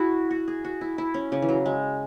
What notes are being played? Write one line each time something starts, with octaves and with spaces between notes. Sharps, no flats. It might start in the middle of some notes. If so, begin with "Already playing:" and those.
Already playing: E4 F#4 G#4
F#4
G#4
F#4
E4
E4
C#4
C#3
E3
F#3
G#3